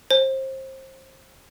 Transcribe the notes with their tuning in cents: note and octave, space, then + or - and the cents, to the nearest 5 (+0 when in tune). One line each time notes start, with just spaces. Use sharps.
C5 +25